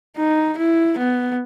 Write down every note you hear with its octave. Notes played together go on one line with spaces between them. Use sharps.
D#4
E4
B3